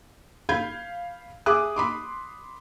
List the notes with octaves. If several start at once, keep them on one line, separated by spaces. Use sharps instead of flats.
F5 B5 G6 G#6
G#4 E5 D6 D#6 F#6
B5 C6 D6